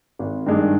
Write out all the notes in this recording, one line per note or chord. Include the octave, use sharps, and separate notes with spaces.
G#1
G2 D#3 G#3 D4